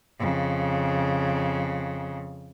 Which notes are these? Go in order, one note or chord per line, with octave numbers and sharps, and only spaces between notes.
F2 C#3